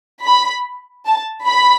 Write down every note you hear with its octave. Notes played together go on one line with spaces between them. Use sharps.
B5
A5
B5